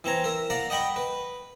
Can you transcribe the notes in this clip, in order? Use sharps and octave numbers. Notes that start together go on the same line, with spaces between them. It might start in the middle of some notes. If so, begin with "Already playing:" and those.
E3 C4 C#5 A#5
A#4 E5
D5 F5 F#5 A#5
D#5 F#5 G5 B5 C#6
B4